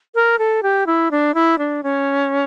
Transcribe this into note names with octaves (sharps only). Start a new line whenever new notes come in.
A#4
A4
G4
E4
D4
E4
D4
C#4